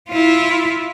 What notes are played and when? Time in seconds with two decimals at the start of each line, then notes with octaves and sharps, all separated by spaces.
0.10 E4 F4